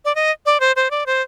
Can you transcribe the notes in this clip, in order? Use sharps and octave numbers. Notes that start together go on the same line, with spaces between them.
D5
D#5
D5
C5
C5
D5
C5